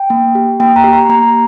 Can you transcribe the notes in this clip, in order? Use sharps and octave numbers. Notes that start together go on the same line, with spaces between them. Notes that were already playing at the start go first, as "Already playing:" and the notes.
Already playing: G5
A#3
G4
A#3 G5
A#5
G4
A#5
A#3 A#5